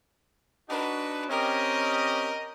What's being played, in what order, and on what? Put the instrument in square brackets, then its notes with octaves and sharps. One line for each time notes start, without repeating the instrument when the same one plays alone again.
[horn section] D4 D#4 F#4 [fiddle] B4
[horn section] C4 C#4 G4 [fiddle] A#4 [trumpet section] D#5